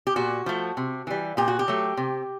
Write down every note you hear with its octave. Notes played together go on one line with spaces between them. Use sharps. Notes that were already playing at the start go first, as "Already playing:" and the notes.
G4
A#2 F#4
F3 A3
C3
E3 G3
A#2 G4
F#4
G4
F#3 A3
C3